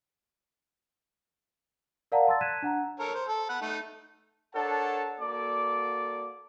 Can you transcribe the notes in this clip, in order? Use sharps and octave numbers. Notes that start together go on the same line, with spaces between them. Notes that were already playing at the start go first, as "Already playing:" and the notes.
A#4 D5 F5 F#5 A5 A#5
A5 C6 E6 A6
F#6 G#6 B6 D#7 E7
D4 F#5 A#5
A4 A#4 C#5
C5
A4
F#5 B5
A3 D#4
D4 A4 A#4 C#5 F#5 A5
A#3 F#4 A4 D5 D6